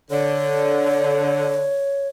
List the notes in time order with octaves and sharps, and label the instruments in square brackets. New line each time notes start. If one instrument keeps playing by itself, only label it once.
[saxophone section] D3 [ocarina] C#5